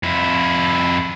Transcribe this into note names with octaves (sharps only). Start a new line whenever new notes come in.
F2 E4